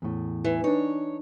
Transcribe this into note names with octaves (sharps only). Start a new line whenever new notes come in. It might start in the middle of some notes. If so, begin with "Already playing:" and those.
E2 A2
E3
D4 D#4 C#5